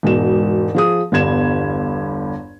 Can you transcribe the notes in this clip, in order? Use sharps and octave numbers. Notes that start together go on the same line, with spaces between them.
E1 G#2 B2 E7
F3 G#4 D#6
G1 E2 G2 G#6 E7